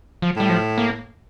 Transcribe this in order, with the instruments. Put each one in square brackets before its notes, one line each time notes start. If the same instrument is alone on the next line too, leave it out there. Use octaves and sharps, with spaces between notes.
[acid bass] F3
[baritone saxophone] A2 [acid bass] G3
[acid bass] F3
A#3